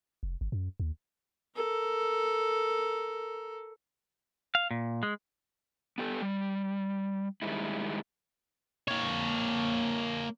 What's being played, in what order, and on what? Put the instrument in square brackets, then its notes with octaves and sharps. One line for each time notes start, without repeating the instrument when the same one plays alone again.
[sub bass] F1
G1
F#2
D#2
[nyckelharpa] A4 A#4
[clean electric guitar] F5
A#2
G#3
[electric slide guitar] B3 G4 A4
G3
D#3 G3 G#3 E4
[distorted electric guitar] A#3 C#5